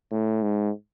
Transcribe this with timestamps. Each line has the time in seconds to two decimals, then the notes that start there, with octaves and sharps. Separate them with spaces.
0.12 A2
0.42 G#2